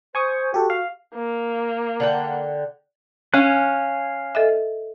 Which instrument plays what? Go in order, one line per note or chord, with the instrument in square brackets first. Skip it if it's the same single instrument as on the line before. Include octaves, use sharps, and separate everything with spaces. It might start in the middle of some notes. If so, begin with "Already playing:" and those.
[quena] C5 [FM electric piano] G#5 C#6 D#6
[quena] F#4 [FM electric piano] G4 A4
[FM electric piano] F5
[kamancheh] A#3
[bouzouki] D3 F#5 G5
[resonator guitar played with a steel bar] C#4 [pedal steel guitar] F5 G#5 F#6
[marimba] A4 D#5 E5